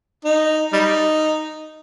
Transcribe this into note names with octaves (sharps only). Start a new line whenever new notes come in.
D#4
G3 D#4